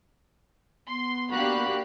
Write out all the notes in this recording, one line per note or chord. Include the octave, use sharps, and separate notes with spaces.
B3 C6
A#3 D4 F#4 G4 F5 B5 F#6